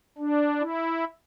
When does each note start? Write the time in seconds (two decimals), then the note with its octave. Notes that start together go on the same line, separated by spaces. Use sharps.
0.18 D4
0.60 E4